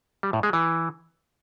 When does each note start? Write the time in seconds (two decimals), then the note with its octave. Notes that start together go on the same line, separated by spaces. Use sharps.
0.23 G3
0.33 A2
0.43 G#3
0.53 E3